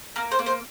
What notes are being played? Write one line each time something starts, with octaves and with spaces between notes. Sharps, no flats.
A#3 A#4
C5
A#3
C5